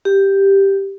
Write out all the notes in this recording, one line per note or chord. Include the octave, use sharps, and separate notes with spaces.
G4